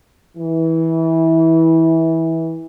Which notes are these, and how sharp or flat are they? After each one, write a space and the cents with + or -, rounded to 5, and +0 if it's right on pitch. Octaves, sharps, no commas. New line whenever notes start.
E3 -20